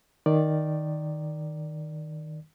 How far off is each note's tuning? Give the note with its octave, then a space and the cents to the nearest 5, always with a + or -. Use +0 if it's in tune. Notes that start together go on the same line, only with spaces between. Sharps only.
D#3 +0 D5 +0